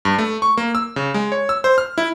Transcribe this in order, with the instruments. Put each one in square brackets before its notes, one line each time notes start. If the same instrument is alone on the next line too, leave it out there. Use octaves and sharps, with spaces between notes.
[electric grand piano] G2
A3
C#6
A#3
E6
C#3
G#3
C#5
E6
C5
F6
E4